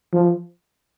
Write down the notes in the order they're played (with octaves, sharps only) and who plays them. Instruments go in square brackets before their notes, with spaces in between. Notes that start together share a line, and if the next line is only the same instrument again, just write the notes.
[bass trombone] F3